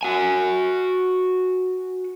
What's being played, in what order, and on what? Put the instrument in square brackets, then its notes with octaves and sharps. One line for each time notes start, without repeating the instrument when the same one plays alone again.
[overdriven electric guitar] F#4 G#5